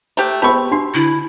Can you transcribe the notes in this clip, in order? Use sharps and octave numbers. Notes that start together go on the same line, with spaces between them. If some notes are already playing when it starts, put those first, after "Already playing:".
A3 G4 C5 A#5
B3 G4 G#4 C5 A5 B5 C#6 E6
D4 F#4 C6 C7
D3 E4